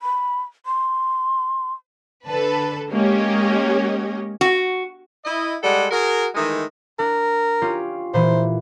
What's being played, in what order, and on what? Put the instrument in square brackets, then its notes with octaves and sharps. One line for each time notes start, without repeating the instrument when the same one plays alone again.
[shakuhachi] B5
C6
[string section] D3 A4 B4 A5
G#3 A#3 C#4 G4 C#5 D#5
[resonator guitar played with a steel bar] F#4
[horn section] E4 D#5
G3 G#3 A4 F#5
F#4 G#4 A#4
D#3 E3 G#3 A3 D#4
[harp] D4 [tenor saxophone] A#4
[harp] C#4 F4 G4
[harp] A#2 E3 [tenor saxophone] C5